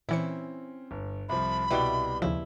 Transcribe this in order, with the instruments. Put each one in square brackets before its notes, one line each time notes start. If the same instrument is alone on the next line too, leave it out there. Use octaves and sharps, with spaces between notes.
[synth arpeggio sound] A#2 E3 C#7 [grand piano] C4 C#4 [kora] E4
[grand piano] G1
[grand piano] C2 F3 [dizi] B5
[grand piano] C2 D5 G7 [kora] B2 G3 E4 [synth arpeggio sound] B4
[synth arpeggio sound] D#2 C#3 F3 [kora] E4